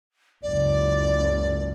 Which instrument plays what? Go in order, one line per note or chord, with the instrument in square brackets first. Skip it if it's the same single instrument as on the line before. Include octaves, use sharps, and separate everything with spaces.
[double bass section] F#1 C#2 [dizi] D5